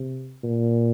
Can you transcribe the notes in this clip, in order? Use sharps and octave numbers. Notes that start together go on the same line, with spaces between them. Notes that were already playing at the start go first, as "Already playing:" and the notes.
Already playing: C3
A#2